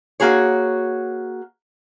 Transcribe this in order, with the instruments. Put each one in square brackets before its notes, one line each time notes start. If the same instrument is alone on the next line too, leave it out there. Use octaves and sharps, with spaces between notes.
[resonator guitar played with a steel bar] A#3 F#4 G#4 C#5